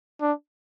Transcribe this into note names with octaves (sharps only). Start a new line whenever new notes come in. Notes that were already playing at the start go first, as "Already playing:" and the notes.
D4